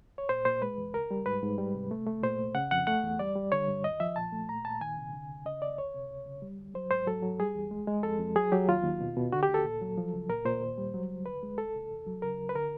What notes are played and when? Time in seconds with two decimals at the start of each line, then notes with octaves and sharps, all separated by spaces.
0.18 C#5
0.29 A#2 C5
0.45 A#2 C5
0.62 G#3 B4
0.78 E2
0.94 C#2 A#4
1.11 G3
1.26 G#2 B4
1.42 G#2
1.58 G3
1.74 C3
1.91 A3
2.07 A3
2.23 A#2 C5
2.39 C2
2.55 C#3 F#5
2.71 F2 F#5
2.87 A3 F#5
3.03 E2
3.19 G3 D5
3.36 G3
3.52 D3 C#5
3.68 G2
3.84 D#2 D#5
4.00 F3 E5
4.16 A#2 A5
4.32 A3
4.49 A#2 A#5
4.65 A#2 A5
4.81 D#3 G#5
4.97 C3
5.13 D3
5.29 D2
5.45 C#3 D#5
5.61 D#2 D5
5.78 D2 C#5
5.94 C3
6.11 C#2
6.26 C#3
6.42 G3
6.58 D2
6.74 F#3 C5
6.91 G#2 C5
7.07 F#3 A4
7.23 F#3
7.39 G3 G#4
7.55 E2
7.71 G#3
7.87 G#3
8.03 F2 A4
8.19 F2
8.35 F#3 G#4
8.52 F#3 G4
8.68 D#2 F4
8.84 D#2
9.01 B2
9.16 B2
9.32 D3 F#4
9.43 G4
9.49 D2
9.54 A4
9.64 A#2
9.81 F#3
9.98 F3
10.14 C#2
10.29 A#2 A#4
10.45 A#2 C5
10.61 D#2
10.78 G3
10.94 F#3
11.10 C#2
11.26 D2 B4
11.43 G#3
11.58 C2 A4
11.75 C2
11.91 E2
12.07 F#3
12.22 C#3 A#4
12.38 D2
12.49 B4
12.55 D3 A#4